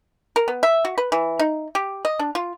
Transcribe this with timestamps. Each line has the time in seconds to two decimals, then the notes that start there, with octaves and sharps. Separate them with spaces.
0.36 A#4
0.48 B3
0.63 E5
0.85 F#4
0.98 B4
1.12 E3
1.39 D#4
1.75 G4
2.05 D#5
2.19 D4
2.35 F4